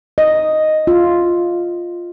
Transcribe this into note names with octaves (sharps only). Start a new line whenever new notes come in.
D#5
F4